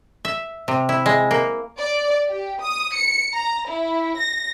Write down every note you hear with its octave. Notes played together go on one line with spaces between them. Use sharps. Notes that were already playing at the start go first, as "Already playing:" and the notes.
E5
C3
E4
G#3
A#3
D5
G4
D#6
C#7
A#5
E4
A#6